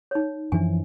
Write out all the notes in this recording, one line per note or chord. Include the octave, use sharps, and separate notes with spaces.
D#4 C#5
F#2 E3 F3 D4 G#5